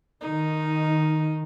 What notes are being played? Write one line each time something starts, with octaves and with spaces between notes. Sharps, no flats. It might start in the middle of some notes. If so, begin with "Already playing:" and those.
D#3 D#4